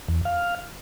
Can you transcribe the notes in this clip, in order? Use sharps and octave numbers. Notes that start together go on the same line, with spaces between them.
E2
F5